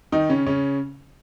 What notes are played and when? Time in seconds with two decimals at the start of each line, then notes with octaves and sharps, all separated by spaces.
0.12 D#3 D#4
0.29 C#3 C#4
0.46 C#3 C#4